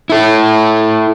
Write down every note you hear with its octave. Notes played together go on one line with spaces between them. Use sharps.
E4 A4